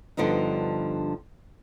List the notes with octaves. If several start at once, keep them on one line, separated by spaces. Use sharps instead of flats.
G2 D3 F3 B3 D#4